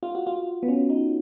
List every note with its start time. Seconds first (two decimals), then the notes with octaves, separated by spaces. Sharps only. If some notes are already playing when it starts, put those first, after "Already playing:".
0.03 F4
0.15 F#4
0.27 F4
0.63 B3
0.68 C#4
0.90 D#4